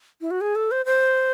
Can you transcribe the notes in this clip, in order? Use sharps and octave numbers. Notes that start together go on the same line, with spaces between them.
E4
F#4
G#4
A4
C5
C5